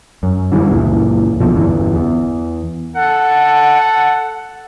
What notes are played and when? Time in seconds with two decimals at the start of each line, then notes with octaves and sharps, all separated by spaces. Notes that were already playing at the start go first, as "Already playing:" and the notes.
0.23 F#2
0.52 D3 E3 F#3 G3
0.69 C#2 F#2 A#2 E3
1.40 C2 B2 D3 F3
1.55 G1 E2 E3
1.95 E2
2.96 A4 F#5